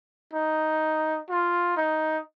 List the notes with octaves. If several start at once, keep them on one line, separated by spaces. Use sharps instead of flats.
D#4
F4
D#4